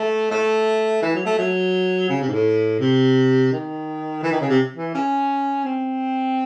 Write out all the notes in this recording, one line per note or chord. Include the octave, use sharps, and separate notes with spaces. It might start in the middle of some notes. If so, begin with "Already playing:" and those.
Already playing: A3
A3
E3
F#3
A3
F#3
C#3
C3
G#2
A2
C3
D#3
E3
D#3
C#3
C3
E3
C#4
C4